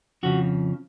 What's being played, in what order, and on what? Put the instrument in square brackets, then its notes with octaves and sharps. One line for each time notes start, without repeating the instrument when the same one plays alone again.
[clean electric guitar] F2 C#3 F3 F#4